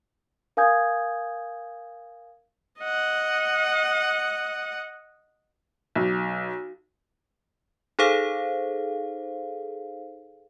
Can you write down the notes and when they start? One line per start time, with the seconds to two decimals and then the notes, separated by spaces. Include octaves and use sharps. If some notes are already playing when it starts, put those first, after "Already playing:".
0.57 A#4 F5 G#5 D#6 G6 G#6
2.81 D#5 F#5
5.95 B1
7.99 D#4 G#4 A4 C5 F5